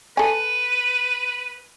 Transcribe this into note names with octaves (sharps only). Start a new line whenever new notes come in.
A4 B4 G#5